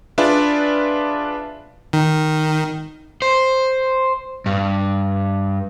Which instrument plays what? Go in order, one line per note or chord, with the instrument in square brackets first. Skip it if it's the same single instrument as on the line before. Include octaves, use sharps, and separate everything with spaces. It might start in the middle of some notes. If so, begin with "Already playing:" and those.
[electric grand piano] D4 F4 G#4 B4 D5 E5
[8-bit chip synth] D#3
[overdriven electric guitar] C5
G2